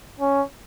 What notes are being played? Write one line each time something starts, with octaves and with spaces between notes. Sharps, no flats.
C#4